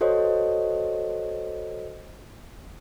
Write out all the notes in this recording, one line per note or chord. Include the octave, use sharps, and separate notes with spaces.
F#4 A4 C5 C#5 D#5